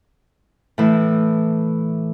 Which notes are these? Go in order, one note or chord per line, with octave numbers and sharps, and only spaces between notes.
A2 E3